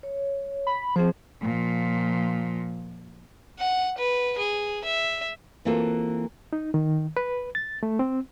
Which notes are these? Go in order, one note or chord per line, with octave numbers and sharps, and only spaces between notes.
C#5
B5
F3 C4 G#4 C5
A#2 F3
F#5
B4
G#4
E5
E3 A#3 C4 F4 F#4 A4
D#4
D#3
B4
A6
A3
C4